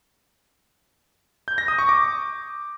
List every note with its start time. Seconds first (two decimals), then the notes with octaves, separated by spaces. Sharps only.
1.48 G6
1.58 A#6
1.68 D#6
1.79 C#6
1.89 D6